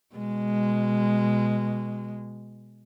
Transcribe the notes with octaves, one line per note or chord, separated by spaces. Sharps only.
B2 G#3